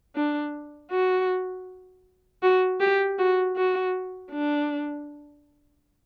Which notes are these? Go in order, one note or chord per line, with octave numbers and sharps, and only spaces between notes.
D4
F#4
F#4
G4
F#4
F#4
D4